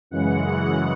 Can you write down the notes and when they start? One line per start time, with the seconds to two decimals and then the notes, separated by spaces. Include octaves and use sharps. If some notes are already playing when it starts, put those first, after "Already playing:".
0.11 F#2 C#3 E3 G#3 F#5